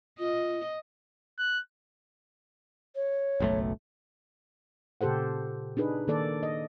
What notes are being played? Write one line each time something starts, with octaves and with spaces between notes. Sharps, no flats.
F4 D#5
F#6
C#5
F#1 B1 A3
A#2 C#3 G4 A4 C5 F#5
D4 D#4 G#4 B4
D#3 A#3 A4 D5
D#5